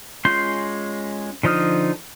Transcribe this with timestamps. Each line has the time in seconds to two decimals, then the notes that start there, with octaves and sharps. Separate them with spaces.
0.25 G#3 C#4 F4 C6 G6
1.43 D3 F3 D#4 D#6 F6